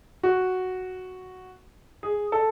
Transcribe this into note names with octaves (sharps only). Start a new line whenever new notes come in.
F#4
G#4
A4